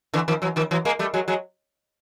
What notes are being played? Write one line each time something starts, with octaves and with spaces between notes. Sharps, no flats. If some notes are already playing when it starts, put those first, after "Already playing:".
D3 E3
D#3 F3
E3 F#3
D#3 F3
E3 F#3
G#3 A#3
G3 A3
F#3 G#3
F#3 G#3